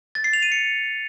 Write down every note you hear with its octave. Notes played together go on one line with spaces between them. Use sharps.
A6
C7
F7
D#7
C#7